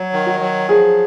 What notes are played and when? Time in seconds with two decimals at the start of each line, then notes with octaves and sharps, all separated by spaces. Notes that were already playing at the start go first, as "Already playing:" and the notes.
Already playing: F#3
0.13 D#3
0.26 F#4
0.40 F#3
0.69 F3 G#4